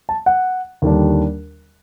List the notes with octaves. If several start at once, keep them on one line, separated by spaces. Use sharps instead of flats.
A5
F#5
D#2 D3 G3 D4